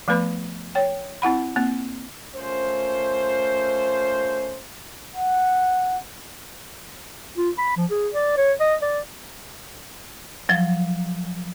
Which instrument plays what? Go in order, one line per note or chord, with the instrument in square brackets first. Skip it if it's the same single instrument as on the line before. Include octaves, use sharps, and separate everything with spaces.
[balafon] F3 A3 B3 B4 B5
C#5 G5
C4 E4 F#5 B5
A#3 C4
[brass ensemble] A3 C#4 F4 A#4 C5
[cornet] F#5
[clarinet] F4
B5
F3
G#4
D5
C#5
D#5
D5
[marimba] F3 F#3